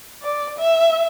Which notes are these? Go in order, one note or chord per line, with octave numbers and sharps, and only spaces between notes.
D5
E5